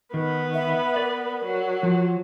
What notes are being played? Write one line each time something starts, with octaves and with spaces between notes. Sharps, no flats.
D#3 B3 B4
E5
A#4 D5
F#3
F3